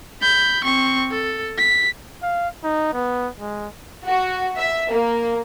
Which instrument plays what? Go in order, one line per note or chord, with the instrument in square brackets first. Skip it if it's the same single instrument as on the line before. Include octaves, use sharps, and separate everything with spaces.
[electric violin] B5 G6
C4 C#6
A4
B6
[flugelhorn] F5
D#4
B3
G#3
[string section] F#4
E5
A#3